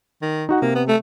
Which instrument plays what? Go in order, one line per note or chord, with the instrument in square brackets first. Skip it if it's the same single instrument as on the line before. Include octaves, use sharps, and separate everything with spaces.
[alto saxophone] D#3
[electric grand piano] D#4 F#4 F#5
[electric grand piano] C3 [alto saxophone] A#3
[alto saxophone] B3
A3